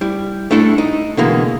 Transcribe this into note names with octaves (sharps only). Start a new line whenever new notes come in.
G3 E4
A3 D4 E4 A4
D#4
B2 D3 E3 G#3 A#3